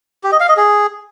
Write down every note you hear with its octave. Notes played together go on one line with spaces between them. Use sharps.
G4
D#5
F5
D#5
G#4